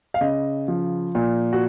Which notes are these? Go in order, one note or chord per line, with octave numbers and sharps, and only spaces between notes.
F5
C#3 D#5
F3
A#2
F#4